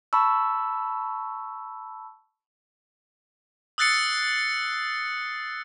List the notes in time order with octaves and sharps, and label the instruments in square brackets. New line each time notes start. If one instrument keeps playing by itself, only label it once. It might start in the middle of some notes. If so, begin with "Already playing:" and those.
[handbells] A5 B5 C#6 E6
[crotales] D#6 E6 F#6 A6 C7 C#7